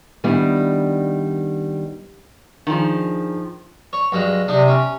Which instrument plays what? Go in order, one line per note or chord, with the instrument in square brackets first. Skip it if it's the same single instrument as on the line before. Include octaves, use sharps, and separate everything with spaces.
[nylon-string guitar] D#3 G3 B3 D4 E4
[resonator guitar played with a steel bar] D#3 F3 [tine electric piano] D4 D#4 G#4
[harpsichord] C#5
G2 F#3 G#3
[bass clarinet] C3 [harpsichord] D4 D#4
[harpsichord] C#4